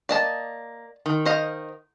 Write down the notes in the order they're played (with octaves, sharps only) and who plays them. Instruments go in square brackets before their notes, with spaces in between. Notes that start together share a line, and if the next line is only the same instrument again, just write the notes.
[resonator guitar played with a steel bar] A#3 [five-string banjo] D5 D#5 A5
[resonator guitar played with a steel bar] D#3
[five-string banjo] C5 D#5 F5